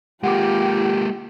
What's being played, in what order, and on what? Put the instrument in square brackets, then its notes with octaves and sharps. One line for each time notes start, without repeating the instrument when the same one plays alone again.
[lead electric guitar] G#3 A#3 [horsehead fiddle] F4 G5 [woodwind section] G4 [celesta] F#5 D6